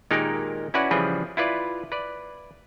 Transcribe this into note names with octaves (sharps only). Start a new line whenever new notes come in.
A#2 D#3 G#3 D#4 G4 A#4
C#4 E4 F#4 B4 D5 F#5
C#3 E3 F3 G3 G#4 B4
E4 F4 B4 D5
B4 D5